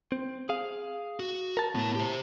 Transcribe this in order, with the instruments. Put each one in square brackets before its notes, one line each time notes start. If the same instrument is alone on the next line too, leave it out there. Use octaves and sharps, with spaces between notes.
[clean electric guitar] C4
G#4 F5
[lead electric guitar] F#4
[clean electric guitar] A#4 A5
[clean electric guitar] A2 [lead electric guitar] B3 A5
[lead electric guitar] G4 C5